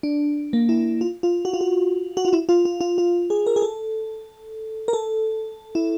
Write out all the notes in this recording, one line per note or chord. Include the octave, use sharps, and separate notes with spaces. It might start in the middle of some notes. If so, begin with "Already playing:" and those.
D4
A#3
E4
F4
F4
F#4
F4
F#4
F#4
F4
E4
F4
F4
F4
F4
G#4
A#4
G#4
A4
A#4
A4
E4